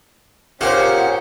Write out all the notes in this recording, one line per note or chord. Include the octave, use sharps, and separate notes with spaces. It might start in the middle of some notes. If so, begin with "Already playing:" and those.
A#2 A#3 C#4 G4 G#4 C5 F#5